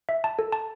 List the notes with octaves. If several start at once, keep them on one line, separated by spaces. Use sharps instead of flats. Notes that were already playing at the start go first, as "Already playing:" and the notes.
E5
A5
A4
A5